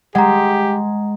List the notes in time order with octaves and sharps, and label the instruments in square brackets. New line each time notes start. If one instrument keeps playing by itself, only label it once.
[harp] G#3 [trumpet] G4 [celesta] F#5 A#5